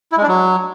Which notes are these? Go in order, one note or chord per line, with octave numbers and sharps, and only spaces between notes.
E4
G#3
D4
F#3